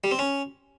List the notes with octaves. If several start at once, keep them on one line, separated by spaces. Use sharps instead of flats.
G3
C4
C#4